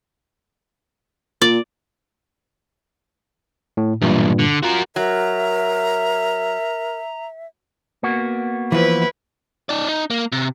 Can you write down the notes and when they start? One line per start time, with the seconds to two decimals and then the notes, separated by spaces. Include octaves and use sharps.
1.42 A#2 D5
3.77 A2
4.02 B1 E2 G2 A#2
4.39 D3
4.63 F4 F#4 A#4
4.96 F#3 A#4 E5 A#5
8.03 A#3 B3 F#4
8.72 E3 F3 E4 B4
9.69 D#4 D5
9.89 D#4
10.10 A#3
10.32 C3